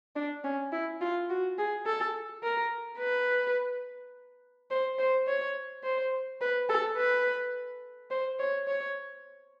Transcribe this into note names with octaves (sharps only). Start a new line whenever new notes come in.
D4
C#4
E4
F4
F#4
G#4
A4
A#4
B4
C5
C5
C#5
C5
B4
A4
B4
C5
C#5
C#5